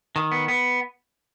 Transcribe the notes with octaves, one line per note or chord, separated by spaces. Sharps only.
D#3
B3
B3